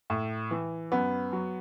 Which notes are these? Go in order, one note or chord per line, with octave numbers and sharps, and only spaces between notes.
A2
E3
F#2 B3
F#3